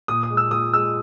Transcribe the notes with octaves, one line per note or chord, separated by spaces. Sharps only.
A#2 D#6
D#6
G#3
E6
A#2 D#6
G#3 E6